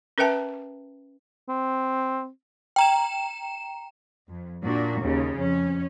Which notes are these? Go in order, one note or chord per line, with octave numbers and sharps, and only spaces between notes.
C#4 A#4 B4 E5 G5 A5
C4
G5 A#5 E7
F2
A#2 D4 F#4
D#2 C#3
F2 C#4